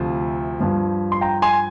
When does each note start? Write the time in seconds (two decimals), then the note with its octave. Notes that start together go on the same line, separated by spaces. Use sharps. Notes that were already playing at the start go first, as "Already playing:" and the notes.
Already playing: D2 C3 F3
0.61 G2 F3
1.12 C6
1.21 G5 A#5
1.42 G#5 C6